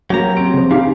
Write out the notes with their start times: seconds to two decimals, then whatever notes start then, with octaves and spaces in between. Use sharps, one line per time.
0.10 F#3 A#3 C#4 G4 A#5
0.37 C4 D7
0.54 C#3 F3
0.71 C#3 D#4 G4 F5